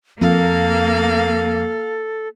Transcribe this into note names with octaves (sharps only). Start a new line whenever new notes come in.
F2 A#3 A4 F5